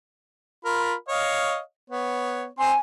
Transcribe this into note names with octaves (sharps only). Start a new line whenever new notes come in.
F4 A#4 B5
C#5 D#5 F5
B3 C#5
C4 G#5 C6